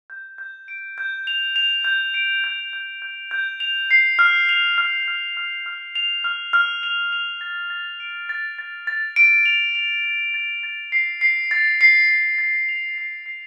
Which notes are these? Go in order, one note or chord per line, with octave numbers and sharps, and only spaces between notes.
G6
G6
D7
G6
F7
F7
G6
D7
G6
G6
G6
G6
F7
C7
F6
F7
F6
F6
F6
F6
F7
F6
F6
F7
F7
A6
A6
D7
A6
A6
A6
D7
F7
F7
A6
A6
A6
C7
C7
A6
C7
C7
A6
F7
C7
C7